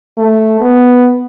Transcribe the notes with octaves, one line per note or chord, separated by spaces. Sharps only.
A3
B3